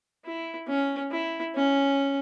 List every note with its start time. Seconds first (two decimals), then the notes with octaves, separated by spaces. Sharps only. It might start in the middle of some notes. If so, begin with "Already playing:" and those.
0.25 E4
0.68 C#4
1.11 E4
1.55 C#4